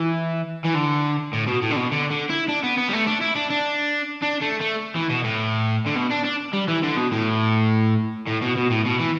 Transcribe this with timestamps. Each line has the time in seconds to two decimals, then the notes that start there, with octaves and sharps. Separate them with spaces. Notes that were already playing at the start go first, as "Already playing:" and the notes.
Already playing: E3
0.65 E3
0.75 D3
1.33 A2
1.47 B2
1.62 A2
1.71 D3
1.76 B2
1.92 D3
2.10 D3
2.30 E4
2.49 D4
2.63 B3
2.77 B3
2.89 G3
2.93 A3
3.07 D4
3.21 E4
3.36 D4
3.50 D4
4.23 D4
4.42 A3
4.61 A3
4.95 E3
5.10 B2
5.24 A2
5.86 D3
5.96 B2
6.11 D4
6.25 D4
6.54 G3
6.68 E3
6.83 D3
6.97 B2
7.12 A2
8.27 A2
8.42 B2
8.57 B2
8.71 A2
8.86 B2
9.00 E3